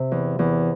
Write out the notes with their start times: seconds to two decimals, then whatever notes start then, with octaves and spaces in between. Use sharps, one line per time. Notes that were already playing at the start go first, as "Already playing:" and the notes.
Already playing: C3
0.11 E2
0.39 E2